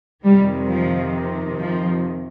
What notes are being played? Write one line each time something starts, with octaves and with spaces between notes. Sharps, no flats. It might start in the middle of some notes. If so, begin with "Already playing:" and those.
F2 C3 D#3 G3
F3
F3